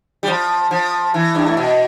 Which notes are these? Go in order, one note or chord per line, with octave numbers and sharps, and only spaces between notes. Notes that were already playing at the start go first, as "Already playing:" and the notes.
G3
F3
F3
E3
G2
A2
B2